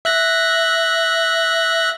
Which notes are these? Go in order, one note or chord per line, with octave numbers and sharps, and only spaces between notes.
E5 F#6 A#6